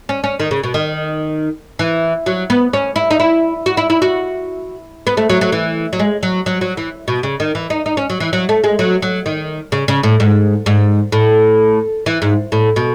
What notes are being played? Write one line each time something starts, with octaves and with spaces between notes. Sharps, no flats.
C#4
C#4
D#3
C#3
B2
D#3
E3
F#3
B3
C#4
E4
D#4
E4
F#4
E4
E4
F#4
B3
A3
F#3
F#3
E3
F#3
G#3
F#3
F#3
F#3
E3
B2
C#3
D#3
E3
D#4
D#4
C#4
F#3
E3
F#3
A3
G#3
F#3
F#3
D#3
C#3
C#3
A2
G#2
G#2
A2
E3
G#2
A2
B2